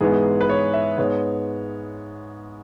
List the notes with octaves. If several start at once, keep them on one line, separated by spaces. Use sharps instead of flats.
G#2 E3 G#3 B3 G#4
B4
C#5
E5
G#2 G#3 B3 C#5